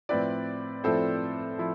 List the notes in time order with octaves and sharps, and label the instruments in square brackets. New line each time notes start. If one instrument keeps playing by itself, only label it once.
[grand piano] A2 F3 C4 E4 B4 D5
A2 F3 C4 E4 A4 C5
F3 E4